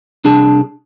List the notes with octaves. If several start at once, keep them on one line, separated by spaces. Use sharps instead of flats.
C2 D4 G#4 A5